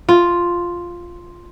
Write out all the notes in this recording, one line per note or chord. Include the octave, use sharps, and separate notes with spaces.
F4